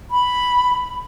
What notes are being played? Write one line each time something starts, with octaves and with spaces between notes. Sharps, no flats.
B5